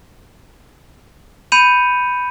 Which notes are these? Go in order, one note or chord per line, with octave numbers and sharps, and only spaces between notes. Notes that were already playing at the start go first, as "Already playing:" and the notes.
B5 G6 C#7 D#7 F7